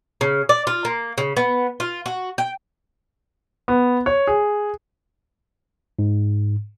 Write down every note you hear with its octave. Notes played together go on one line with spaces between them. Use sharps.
C#3
D5
F4
A#3
C#3
B3
F4
F#4
G5
B3
C#5
G#4
G#2